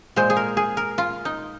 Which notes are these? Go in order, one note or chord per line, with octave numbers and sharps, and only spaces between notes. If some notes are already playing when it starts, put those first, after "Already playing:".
A#2 G#3 C5
G#4
A#4
G#4
A#4
F4
D#4